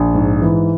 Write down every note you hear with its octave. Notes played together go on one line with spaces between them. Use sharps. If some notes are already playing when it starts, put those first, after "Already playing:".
Already playing: A#1
G#2
E3